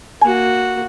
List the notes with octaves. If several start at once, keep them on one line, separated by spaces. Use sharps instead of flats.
A#3 F#4 G#5